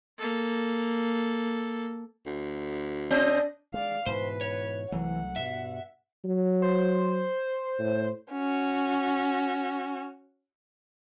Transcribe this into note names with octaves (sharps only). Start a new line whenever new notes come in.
A#3 A4
D2
C4 D4 D#5
G#3 D5 F5
G#2 B2 E3 B4 C5
C#5
C2 E3 F#3 A3 F#5
G2 B2 E5
F#3
C5
A2
C#4 F#4